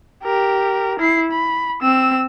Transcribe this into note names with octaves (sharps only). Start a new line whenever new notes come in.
G4 A#4
E4 C7
B5
C4 E6